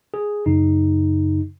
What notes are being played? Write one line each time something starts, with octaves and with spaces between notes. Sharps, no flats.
G#4
F#2 C#3 D#4